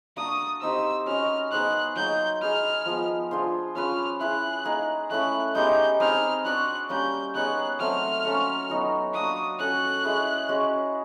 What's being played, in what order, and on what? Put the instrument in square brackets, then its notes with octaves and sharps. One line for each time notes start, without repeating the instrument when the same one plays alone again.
[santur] A#3 D4 F#4 [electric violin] D#6
[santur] C4 D#4 G4 C5 [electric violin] E6
[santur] C#4 F#4 B4 D#5 [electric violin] F6
[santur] B3 D#4 G#4 C5 [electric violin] F#6
[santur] F#3 A#3 D#4 G#4 [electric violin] G6
[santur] D#4 G#4 B4 [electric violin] F6
[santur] F3 G#3 B3
D4 F4 G#4 C5
[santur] C#4 F4 G#4 B4 [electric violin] F6
[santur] E4 G#4 B4 [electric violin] F#6
[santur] A#3 D#4 G#4
[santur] A3 C#4 E4 [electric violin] F#6
[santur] G#3 B3 D#4 G4 [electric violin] G6
[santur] C4 D#4 G#4 B4 [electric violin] F6
[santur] D4 F#4 B4 D5 [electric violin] F#6
[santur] G3 A#3 C#4 [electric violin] G6
[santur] B3 D#4 G#4 C#5 [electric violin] F#6
[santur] F#3 A3 C4 [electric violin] F6
[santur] A#3 C#4 F#4 A4
F#3 B3 D#4 F#4
[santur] A#3 D4 F#4 [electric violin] D#6
[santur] C#4 F#4 A4 [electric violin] F#6
[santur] G#3 C#4 E4 G#4
G#3 C#4 F#4